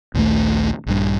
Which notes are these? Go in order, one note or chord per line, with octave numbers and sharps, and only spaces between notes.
A#1 D#2 D3 A3
A#1 G2